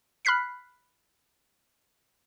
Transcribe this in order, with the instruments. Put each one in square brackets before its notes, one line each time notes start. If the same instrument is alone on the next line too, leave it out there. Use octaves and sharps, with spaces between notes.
[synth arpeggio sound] B5 F6 F#6 B6 C7